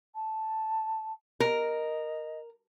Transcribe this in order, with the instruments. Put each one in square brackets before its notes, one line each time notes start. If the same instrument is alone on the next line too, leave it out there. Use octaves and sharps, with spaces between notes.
[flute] A5
[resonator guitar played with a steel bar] A#4 [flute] D#5